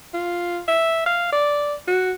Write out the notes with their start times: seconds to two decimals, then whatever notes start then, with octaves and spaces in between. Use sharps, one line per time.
0.14 F4
0.68 E5
1.06 F5
1.32 D5
1.88 F#4